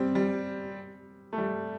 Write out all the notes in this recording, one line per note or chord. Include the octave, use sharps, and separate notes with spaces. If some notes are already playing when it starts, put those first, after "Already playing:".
Already playing: G3 C4
G3
A3
G3